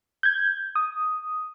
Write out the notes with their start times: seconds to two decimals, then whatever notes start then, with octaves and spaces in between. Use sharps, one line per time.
0.23 G6 G#6
0.76 D#6